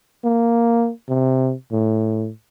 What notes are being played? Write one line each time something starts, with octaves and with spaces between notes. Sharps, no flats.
A#3
C3
A2